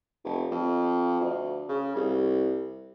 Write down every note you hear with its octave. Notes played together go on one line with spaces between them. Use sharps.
F1
F2
D2
C#3
C2